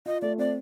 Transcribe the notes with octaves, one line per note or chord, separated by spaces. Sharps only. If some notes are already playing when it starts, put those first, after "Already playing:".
F4 D#5
A3 D5
C4 D5